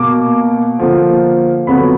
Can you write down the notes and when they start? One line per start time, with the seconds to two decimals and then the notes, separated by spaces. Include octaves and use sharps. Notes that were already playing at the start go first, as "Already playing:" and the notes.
Already playing: B2 A#3 D6
0.79 D3 F3 A#3
1.67 F2 D3 F#3 B3 B5